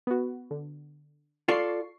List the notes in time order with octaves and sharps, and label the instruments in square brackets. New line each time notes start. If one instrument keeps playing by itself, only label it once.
[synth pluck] B3 F#4
D3
[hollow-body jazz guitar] F4 A4 D5 [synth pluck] C#6 C7